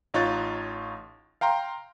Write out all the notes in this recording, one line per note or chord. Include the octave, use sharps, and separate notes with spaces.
A1 D#4 F4 C#5 F#6 A6
F5 G5 A#5 C6